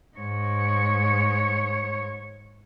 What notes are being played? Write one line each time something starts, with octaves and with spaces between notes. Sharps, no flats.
G#2 C#5